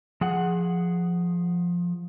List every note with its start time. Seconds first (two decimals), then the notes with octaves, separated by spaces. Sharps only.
0.21 F3 G#4 F#5